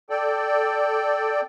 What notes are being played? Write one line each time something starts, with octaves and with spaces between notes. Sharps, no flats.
A4 D5 G5